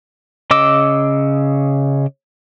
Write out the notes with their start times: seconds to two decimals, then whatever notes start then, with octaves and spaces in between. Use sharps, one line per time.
0.51 C#3 D#5 D6 E6